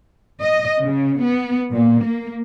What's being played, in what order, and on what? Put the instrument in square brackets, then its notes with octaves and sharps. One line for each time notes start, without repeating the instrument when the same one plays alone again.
[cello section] D#5
C#3
B3
A#2
A#3